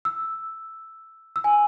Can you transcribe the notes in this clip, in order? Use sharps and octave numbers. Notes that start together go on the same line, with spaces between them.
E6
E6
G#5